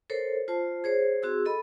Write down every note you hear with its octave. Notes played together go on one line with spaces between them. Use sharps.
A4 A#4 C5 C#5
F4 C5 A5
G#4 C5 C#5
C4 F#4 G#4 E6
A4 D#5 B5